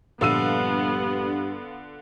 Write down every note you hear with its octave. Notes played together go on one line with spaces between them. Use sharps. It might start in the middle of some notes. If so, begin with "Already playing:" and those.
A#1 G2 D3 B3 F4 E6 D#7